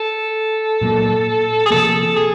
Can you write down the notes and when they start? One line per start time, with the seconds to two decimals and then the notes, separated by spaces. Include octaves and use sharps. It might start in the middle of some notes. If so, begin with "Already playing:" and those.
Already playing: A4
0.81 A#2 F#3 A#3
1.66 G#4
1.70 C3 F3 A#3 A4
2.16 G#4